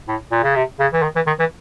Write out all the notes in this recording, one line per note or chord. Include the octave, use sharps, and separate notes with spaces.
A2
A#2
C#3
C3
C#3
E3
D#3
E3
D#3
E3